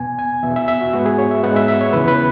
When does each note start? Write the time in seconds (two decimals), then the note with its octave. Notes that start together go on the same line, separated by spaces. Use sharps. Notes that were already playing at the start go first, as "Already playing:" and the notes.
Already playing: E2 B2 B3 G#5
0.19 G#5
0.43 E2 B2 B3 E5
0.56 E5
0.68 E5
0.81 F#4
0.93 G#2 G#3 B3 F#4
1.06 G#4
1.18 C#5
1.31 E5
1.43 G#2 G#3 B3 F#5
1.56 E5
1.68 E5
1.81 C#5
1.93 E2 C#3 E3 B3 B4
2.08 B4